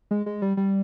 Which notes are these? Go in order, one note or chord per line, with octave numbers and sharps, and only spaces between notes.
G#3
G#3
G3
G3